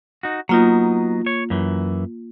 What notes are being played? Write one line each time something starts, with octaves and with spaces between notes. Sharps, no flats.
D#4 F#4
F#3 A#3 B3 D#4 F4
C#5
F#2 E3